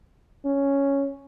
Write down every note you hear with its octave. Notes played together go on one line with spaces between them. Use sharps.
C#4